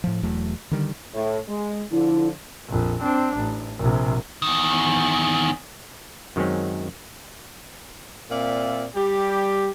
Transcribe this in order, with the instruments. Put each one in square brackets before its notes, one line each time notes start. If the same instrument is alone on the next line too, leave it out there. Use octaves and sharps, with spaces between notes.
[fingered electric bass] A2 F3
E1 E2 F#3 A3
D3 D#3 G3
[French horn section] A2
G#3
[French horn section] D3 F3 [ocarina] E4
[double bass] A#1 F2
C4 D4
A1
A#1 C3
[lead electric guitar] E2 D#3
[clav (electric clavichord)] F#2 D#3 F#3 G#3 C4 C#4
[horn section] A#2 C4 D5 E5 F5
G3 G4